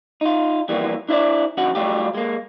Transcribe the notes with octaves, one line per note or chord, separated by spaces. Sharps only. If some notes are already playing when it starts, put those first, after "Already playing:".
D#4 F4
F2 E3 G3 A#3 B3
D4 E4 C5 D5
F2 D3 C#4 F#4 F#5
F#3 G3 A3 F4 G4
G#3 A#3